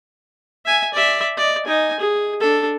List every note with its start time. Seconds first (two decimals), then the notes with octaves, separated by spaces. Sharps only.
0.65 E5 G#5
0.94 D5 E5
1.37 D5 D#5
1.66 D#4 G#5
2.00 G#4
2.40 D4 A4